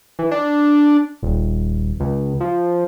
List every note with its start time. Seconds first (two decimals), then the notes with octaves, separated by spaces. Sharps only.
0.19 E3
0.31 D4
1.23 D#1
2.00 C#2
2.40 F3